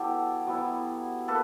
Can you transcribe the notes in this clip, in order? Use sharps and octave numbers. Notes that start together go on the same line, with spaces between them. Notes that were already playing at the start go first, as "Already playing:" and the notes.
Already playing: F#3 B3 E4 G4 A4
F#3 B3 E4
A#3 A4 B4